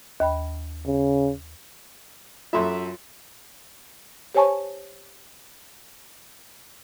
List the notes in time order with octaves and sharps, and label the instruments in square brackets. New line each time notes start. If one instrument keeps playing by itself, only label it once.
[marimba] D#2 G5 B5
[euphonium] C#3
[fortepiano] F#2 A4 E5 [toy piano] F4 C6
[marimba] G4 C5 C#5 G#5 A5 C#6